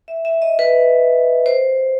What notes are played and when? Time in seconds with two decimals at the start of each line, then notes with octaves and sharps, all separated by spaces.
0.08 E5
0.25 E5
0.42 D#5
0.59 B4
1.46 C5